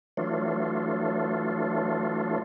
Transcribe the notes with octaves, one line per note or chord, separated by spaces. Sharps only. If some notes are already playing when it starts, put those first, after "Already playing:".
E3 F#3 A3 D4 F4